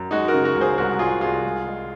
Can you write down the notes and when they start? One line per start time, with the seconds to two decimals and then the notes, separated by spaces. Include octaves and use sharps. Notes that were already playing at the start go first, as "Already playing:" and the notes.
Already playing: F#2
0.11 G#3 D#4 F#4
0.28 F#4 A#4
0.34 C#3
0.44 F#4 A#4
0.55 C#2
0.61 G#4 C5
0.78 C2 F#4 A#4
0.99 C2 F4 G#4
1.21 C2 F4 G#4
1.45 G#3
1.67 G#3